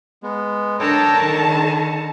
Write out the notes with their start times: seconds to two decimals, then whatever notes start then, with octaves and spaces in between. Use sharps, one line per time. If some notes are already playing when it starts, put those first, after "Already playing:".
0.23 G#3 B3
0.80 D3 D4 A4 A#4 C#5 G5 A5 A#5
1.19 D#3 C#6